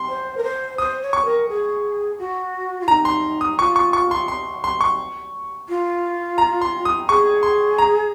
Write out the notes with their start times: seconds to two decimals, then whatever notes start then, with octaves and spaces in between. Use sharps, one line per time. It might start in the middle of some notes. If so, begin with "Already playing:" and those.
Already playing: C6
0.09 C5
0.37 A#4
0.43 C5
0.78 C5 D#6
1.01 C#5
1.13 C#6
1.25 A#4
1.49 G#4
2.18 F#4
2.80 F4
2.88 D#4 A#5
3.05 C6
3.41 D#6
3.58 F4 C#6
3.76 C#6
3.93 C#6
4.11 C6
4.28 C6
4.64 C6
4.81 C#6
5.68 F4
6.38 A#5
6.61 C6
6.85 D#6
7.08 G#4 C#6
7.43 C6
7.78 A#5